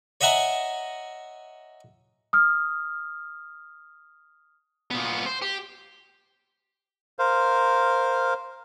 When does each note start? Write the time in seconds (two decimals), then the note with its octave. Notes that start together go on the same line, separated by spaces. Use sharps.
0.21 C#5 D#5 E5 F#5 G#5 A#5
2.33 D#6 F6
4.91 A#2 B3
5.26 C5
5.42 G4
7.19 A#4 C5 F5